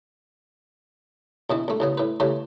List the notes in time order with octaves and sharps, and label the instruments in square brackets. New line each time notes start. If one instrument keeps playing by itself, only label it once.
[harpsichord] A#1 B2 E3
A#1 A3
A1 C#3 B3
A2 B4
C#3 E3 A3 G4